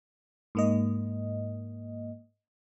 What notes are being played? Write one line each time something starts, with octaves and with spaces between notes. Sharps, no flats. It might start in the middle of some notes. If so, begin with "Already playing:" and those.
G#2 A#3 D#5